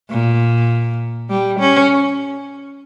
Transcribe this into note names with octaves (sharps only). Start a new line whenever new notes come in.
A#2
G3
C#4